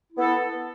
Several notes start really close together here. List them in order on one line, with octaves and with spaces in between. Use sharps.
E4 B3 A4